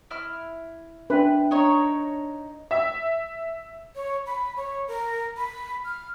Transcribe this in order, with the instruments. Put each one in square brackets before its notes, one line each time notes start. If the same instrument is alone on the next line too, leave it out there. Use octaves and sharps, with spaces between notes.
[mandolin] E4 E6 F6
[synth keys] D4 E5 G5 [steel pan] B4
[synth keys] D4 [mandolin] D#4 A#4 C#5
[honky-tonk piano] E5
[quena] C#5
B5
C#5
A#4
B5
F6